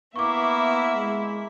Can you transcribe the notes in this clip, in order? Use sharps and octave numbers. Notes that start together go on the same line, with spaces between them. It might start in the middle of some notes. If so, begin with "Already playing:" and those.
A#3 B3 E4 E5 C#6 D6
G#3